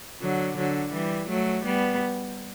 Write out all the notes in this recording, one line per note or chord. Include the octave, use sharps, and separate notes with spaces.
D3 F#3
D3 F#3
E3 G3
F#3 A3
G3 B3